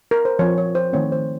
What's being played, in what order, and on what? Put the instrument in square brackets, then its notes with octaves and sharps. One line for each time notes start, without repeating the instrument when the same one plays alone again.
[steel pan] A#4
C5
F3 C4 C#5
C#5
C5
D#3 A3 C4 C#5
C5